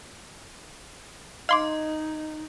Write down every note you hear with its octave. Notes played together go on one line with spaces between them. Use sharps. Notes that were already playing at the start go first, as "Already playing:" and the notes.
D#4 D#5 F5 C6 D6